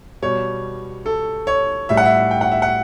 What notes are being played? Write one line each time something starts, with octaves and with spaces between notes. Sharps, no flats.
B2 G3 C#5
A4
C#5
A2 G3 E5
F#5
E5
G5
F#5
E5
F#5